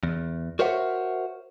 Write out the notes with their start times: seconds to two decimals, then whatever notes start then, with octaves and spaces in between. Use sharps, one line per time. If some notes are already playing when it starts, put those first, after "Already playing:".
0.03 E2
0.59 F#4 A#4 C5 C#5 E5 F#5